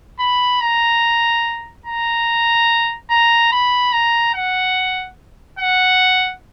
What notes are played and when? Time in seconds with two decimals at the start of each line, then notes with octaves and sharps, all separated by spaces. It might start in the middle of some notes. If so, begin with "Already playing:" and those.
0.20 B5
0.61 A#5
1.86 A#5
3.11 A#5
3.52 B5
3.93 A#5
4.34 F#5
5.59 F#5